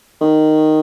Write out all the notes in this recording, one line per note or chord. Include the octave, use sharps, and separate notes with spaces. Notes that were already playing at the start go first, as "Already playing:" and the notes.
D#3